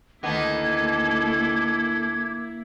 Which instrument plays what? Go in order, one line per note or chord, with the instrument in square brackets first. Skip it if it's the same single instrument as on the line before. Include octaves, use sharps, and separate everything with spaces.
[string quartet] D2 A4 [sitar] D#3 B3 [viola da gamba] A#3 E4 [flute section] D6 G#6